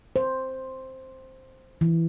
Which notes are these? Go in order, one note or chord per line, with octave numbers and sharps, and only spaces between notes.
C5
E3